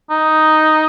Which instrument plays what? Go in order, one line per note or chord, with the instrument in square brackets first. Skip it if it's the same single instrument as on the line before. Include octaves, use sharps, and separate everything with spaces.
[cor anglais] D#4